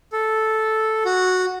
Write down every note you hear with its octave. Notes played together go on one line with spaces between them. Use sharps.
A4
F#4